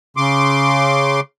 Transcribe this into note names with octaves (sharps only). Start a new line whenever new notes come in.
C#3 C6 D6